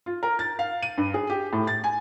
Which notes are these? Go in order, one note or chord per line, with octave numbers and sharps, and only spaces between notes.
F4
A#4
A6
F5
D#7
G2
G#4
G4
A2
A6
G#5